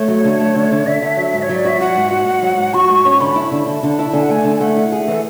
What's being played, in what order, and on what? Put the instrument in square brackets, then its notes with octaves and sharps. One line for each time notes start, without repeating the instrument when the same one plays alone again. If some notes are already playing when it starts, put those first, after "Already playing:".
Already playing: [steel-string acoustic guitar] A3 [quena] C#5
[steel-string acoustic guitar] F#3
D3
A3
D3
D3
[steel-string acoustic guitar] D3 [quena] E5
[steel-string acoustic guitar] D3
F#3
G#2
[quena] C#5
[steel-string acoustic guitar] F#3
[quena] D5
[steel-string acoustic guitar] F#4 [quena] E5
[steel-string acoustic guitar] F#4 [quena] F#5
[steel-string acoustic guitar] G#2
F#4
G#2
F#3
G#2
[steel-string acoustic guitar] F#4 [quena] C#6
[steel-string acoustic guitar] G#2
C#4
[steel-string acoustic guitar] D3 [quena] B5
[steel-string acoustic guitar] E4
D3
[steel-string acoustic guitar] D3 [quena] A5
[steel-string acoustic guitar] D3
E4
[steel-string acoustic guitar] D3 [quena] G#5
[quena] F#5
[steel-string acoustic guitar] A3 [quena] G#5
[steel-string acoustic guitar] D3
[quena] G#5
[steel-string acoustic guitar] A3 [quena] F#5
[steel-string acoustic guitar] E4
G#4
[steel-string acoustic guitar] E3 [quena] A4